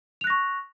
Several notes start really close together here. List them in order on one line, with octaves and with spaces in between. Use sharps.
F7 F#6 A#6 C#6